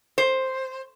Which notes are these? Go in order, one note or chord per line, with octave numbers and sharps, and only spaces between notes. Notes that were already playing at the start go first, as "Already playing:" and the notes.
C5